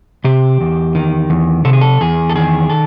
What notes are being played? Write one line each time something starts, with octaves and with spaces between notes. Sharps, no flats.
C3 G4
E2
D#3
E2
C3 A4
G#4
A4
E2 G#4
A4
D#3 G#4
A4